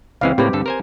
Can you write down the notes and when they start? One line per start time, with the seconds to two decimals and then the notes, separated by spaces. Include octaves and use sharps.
0.21 C#2 E3 G#3 C4 F5
0.38 A2 C#3 A#3 C4 G4 B4
0.53 G2 D3 A4
0.66 A#4 C5 G#5